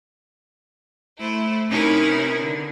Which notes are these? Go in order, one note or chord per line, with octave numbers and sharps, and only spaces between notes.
A3 E4 C5
C3 C#4 D#4 E4 A#4 B4
D3